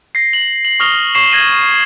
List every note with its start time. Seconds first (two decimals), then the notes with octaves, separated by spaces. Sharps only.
0.15 A#6 C7
0.33 F#7
0.65 F#7
0.80 C#6 D#6 F6 A#6 F7 G7
1.15 C#6 C7 E7
1.31 G6 G#6 A#6 D#7 F7 F#7